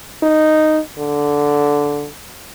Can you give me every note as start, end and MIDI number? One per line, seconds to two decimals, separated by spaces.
0.23 0.80 63
0.98 2.08 50